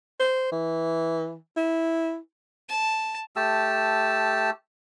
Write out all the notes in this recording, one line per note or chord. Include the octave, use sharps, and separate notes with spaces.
C5
E3
E4
A5
A3 G4 A5 E6